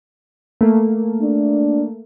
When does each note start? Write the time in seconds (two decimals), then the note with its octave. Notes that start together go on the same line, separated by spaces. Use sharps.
0.61 A3 A#3
1.22 D4